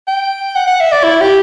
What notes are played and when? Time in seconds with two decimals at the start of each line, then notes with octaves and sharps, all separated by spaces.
0.08 G5
0.56 F#5
0.67 F#5
0.80 E5
0.92 D5
1.04 E4
1.21 G4